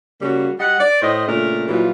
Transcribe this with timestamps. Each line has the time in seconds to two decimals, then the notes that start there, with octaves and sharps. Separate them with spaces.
0.21 C#3 G3 A#3 C#4 F#4
0.59 G3 D#5 F#5
0.80 D5
1.02 A2 C5 C#5 D#5
1.27 A#2 C#3 A3 D4 A#4
1.69 A#2 E3 F#3 G3 F4